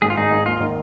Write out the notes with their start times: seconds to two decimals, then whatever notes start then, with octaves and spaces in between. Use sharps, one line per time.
0.02 G#1 G#4
0.10 F4
0.17 G#1 D#4 G#4
0.31 G#1
0.46 D#2 F4
0.60 D#3